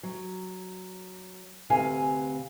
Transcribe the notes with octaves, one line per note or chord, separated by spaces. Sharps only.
F#3
D2 C3 B4 F5 G#5